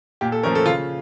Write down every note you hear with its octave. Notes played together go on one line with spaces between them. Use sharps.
A#2 G4
A4
F3 A3 C#4 A#4
A4
C#3 F4